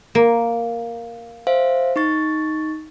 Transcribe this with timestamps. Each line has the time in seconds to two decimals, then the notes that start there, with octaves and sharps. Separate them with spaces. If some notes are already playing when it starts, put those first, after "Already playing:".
0.15 A#3
1.47 C5 E5 F5
1.96 D#4 C#6 A6